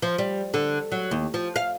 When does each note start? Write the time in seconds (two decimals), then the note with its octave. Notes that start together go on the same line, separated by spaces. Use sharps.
0.02 F3
0.18 G3
0.54 D3
0.92 F#3
1.11 D#2
1.34 F3
1.56 F5